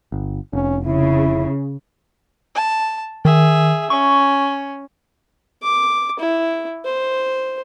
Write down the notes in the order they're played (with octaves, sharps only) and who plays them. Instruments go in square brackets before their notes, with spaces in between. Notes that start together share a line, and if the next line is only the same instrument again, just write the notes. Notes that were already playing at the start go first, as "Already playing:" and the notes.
[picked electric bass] G1
[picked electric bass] F1 [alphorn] C#4
[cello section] C#3 [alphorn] E4
[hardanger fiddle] A5
[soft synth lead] D#3 [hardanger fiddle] G#4 E5
[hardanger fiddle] C#4 [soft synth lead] C#6
[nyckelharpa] D6
E4
C5